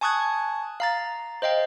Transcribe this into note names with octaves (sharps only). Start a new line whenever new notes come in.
G#5 A5 C#6 D#6 F#6 G#6
F5 A#5 A6
C5 D#5 F5 G5